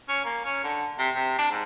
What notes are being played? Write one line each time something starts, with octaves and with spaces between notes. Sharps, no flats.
C#4
A#3
C#4
D3
C3
C3
D4
G#2